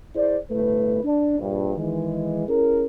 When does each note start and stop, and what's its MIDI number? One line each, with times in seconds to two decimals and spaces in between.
0.15 0.38 64
0.15 0.38 68
0.15 0.38 72
0.15 0.38 74
0.51 1.05 31
0.51 1.05 45
0.51 1.05 57
0.51 1.05 71
1.05 1.38 62
1.39 1.76 34
1.39 1.76 43
1.77 2.48 51
1.77 2.48 52
1.77 2.48 56
2.49 2.86 61
2.49 2.86 64
2.49 2.86 68
2.49 2.86 70